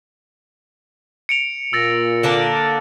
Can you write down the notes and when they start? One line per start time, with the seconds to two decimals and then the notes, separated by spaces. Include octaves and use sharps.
1.29 C#7 D7 F7
1.73 A#2 E6 A6 A#6
2.23 D3 A#3 D4